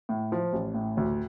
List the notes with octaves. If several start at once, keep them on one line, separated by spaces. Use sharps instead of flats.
A2
F3
A1
A2
D2